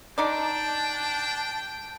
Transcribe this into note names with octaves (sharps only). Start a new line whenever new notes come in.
D3 D4 D#4 D5 G5 A5